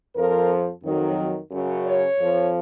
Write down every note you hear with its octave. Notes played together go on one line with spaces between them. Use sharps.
F2 F3 A#4
F2 D#3 F#3
F#2 C#3 F#3
C#5
F2 F3